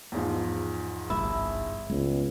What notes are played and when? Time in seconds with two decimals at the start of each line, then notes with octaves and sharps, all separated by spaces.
0.12 E2 G#2 F3
1.10 G1 C2 G2 E4
1.90 C#2 G#3 B3